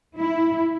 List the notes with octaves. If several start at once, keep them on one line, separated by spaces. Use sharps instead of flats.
E4